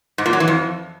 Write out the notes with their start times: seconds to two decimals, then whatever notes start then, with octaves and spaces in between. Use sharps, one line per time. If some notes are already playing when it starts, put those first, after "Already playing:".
0.18 G#2
0.26 A#2
0.33 F#3
0.40 E3
0.48 F2